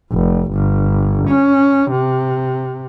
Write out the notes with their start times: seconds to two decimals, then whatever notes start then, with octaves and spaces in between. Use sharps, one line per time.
0.12 F1
0.52 G1
1.28 C#4
1.91 C3